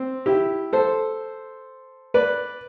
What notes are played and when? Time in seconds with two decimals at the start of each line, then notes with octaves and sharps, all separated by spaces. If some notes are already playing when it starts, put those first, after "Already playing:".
Already playing: C4
0.26 E4 G4
0.73 A4 C5
2.14 B4 D5